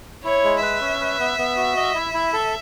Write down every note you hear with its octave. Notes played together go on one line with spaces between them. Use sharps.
E4 C#5
G#3
B4 E5
C#4
B4
B3
B3
F#4
D#5
E4
E4
A4